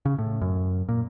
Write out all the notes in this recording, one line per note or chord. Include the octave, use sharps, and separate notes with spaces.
C#3
A2
F#2
A#2